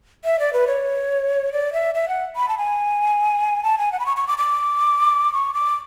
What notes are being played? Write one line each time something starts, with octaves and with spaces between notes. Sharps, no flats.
E5
D5
B4
C#5
D5
E5
E5
F#5
B5
A5
G#5
A5
G#5
F#5
B5
C#6
C#6
D6
D6
C#6
D6